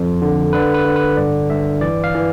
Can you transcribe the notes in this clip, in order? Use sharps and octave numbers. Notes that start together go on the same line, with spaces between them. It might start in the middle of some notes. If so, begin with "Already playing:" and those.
Already playing: F2 C5
D3
D3 B4
B4
D3
B4
G2 D5
G2 E5
E3 D5
F5
E3